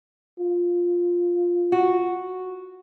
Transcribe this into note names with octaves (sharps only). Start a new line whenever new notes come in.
F4
F#4